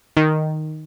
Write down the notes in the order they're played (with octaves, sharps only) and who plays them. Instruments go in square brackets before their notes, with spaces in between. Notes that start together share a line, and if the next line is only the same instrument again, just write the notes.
[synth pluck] D#3